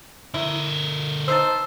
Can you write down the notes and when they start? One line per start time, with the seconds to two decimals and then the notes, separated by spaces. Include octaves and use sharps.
0.34 D3 E4 A#4
1.28 B3 D#4 A4 C5 E6